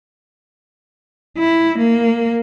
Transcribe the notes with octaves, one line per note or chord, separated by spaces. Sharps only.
E4
A#3